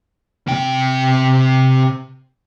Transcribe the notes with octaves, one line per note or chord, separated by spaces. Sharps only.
C3 G5